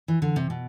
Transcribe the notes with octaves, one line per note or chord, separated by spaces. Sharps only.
E3
D3
C3
B2